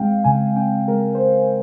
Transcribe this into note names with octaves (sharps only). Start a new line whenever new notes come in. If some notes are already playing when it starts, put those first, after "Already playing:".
Already playing: G#3 C4 F5 G5
C#3 G#5
C4 G5
G#3 A#4
C5